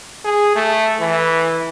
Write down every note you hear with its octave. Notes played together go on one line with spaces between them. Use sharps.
G#4
A3
E3